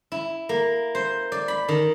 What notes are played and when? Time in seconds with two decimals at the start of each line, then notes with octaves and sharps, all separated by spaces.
0.12 E4
0.49 A#3
0.95 C5
1.32 D5
1.48 B5
1.68 D#3